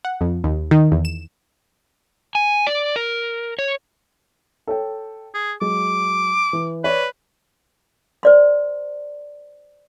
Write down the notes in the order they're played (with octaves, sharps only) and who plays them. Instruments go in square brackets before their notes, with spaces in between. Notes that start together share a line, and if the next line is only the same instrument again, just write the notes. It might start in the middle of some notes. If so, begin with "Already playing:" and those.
[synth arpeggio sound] F#5
F2
D#2
D#3
E2
E7
[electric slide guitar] G#5
D5
A#4
C#5
[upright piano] A4 C#5 G5
[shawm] G#4
[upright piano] F#3 G#3 [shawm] D6
[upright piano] E3
[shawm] B4 [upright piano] C#5 D5
[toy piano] C5 D5 C6